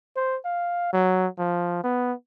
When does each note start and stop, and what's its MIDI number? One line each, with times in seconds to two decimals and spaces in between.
0.16 0.37 72
0.45 0.92 77
0.93 1.27 54
1.39 1.79 53
1.84 2.13 59